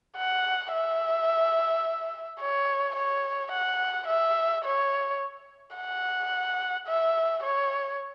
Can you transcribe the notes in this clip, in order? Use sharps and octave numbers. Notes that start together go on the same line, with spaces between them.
F#5
E5
C#5
C#5
F#5
E5
C#5
F#5
E5
C#5